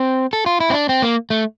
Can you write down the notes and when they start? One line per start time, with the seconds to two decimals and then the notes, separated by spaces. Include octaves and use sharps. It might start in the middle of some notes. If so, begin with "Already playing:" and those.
Already playing: C4
0.33 A4
0.46 F4
0.60 E4
0.70 C4
0.74 D4
0.89 C4
1.02 A#3
1.30 A3